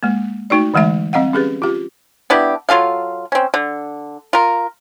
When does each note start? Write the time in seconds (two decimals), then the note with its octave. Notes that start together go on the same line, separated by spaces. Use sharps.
0.03 G#3 A#3
0.50 A3 D#4 F#4 D5
0.74 D3 E3 G#3 A3 E5
1.13 G3 C4 D#5 F5 F#5
1.33 C#4 G4 G#4 B4
1.62 F4 G4
2.30 B3 D4 E4 G4
2.69 F#3 F4 A4 F5
3.32 C4 C#4
3.54 D3
4.33 F4 A#4